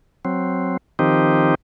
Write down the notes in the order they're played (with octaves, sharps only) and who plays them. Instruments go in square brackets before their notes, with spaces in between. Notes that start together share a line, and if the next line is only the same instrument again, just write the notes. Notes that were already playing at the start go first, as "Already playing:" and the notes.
[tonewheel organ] F#3 C4
D#3 F3 C4 D#4 G4